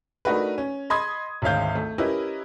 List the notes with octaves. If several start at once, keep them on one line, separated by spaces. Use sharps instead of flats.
A3 D4 D#4 F#4 A#4 B4
C#4
D#5 B5 C6 D#6 G#6
G#1 D2 C#5 F5 G6
A3
C#4 E4 G4 A#4 B4 D#5